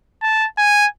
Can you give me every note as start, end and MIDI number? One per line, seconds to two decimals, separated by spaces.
0.22 0.46 81
0.58 0.87 80